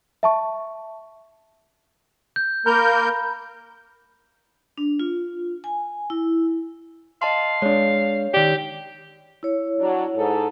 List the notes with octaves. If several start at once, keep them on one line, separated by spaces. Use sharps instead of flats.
E5 A5 C#6
G6
A#3 A#4 A#5 B5 G6
D4
F4
G#5
E4
D#5 F5 A5 C6
G#3 D4 C#5
D#3 G4 D5
E4 C#5
F#3 D4
G#2 A4